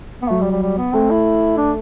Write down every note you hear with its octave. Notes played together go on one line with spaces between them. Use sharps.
B3
F#3 A3
G3
G3
G3
B3
A3 C4
E4
D4